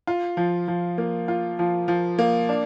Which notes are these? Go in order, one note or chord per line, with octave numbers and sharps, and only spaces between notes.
F4
F3
F3
A#3
F4
F3
F3
A#3
D4